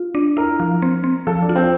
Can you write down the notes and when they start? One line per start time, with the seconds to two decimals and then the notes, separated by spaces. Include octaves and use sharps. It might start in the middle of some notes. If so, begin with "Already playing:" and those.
Already playing: F4
0.15 D4
0.37 E4 A#4
0.60 F3
0.82 C4
1.04 C4
1.27 F3 A4
1.42 D4
1.49 F4
1.56 C4